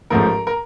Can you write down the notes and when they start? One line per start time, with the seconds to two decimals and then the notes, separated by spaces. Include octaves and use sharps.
0.10 A1 G#2 F3 A3 A#4
0.47 A#4